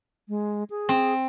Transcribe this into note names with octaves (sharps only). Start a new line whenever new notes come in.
G#3
G#4
C4